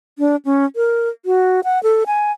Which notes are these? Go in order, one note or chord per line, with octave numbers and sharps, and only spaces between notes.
D4
C#4
A#4
F#4
F#5
A4
G#5